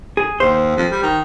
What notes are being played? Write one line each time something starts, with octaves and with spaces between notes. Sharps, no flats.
G#4
D#2 C5
F2
G3
D#3